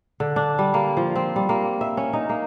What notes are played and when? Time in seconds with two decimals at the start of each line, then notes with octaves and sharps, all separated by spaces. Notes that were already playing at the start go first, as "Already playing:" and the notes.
0.20 D3
0.36 D4
0.59 G3
0.74 A#3
0.97 F3
1.16 C4
1.36 G3
1.49 A#3
1.81 E5
1.97 C#4
2.13 D#4
2.29 A#3